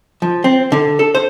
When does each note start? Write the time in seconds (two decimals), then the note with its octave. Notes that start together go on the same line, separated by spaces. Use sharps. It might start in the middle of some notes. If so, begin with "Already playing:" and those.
0.22 F3
0.44 C4
0.72 D3
0.99 A4
1.15 C5